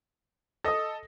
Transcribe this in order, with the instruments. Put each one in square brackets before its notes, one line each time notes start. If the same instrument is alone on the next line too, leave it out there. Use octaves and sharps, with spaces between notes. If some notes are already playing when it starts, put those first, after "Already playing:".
[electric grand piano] A4 D#5 [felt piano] D#6 A#6